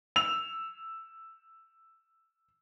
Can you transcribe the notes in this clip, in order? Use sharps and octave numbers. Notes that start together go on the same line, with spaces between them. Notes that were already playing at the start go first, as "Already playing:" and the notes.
E6 F7